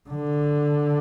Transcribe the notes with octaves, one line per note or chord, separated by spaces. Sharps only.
D3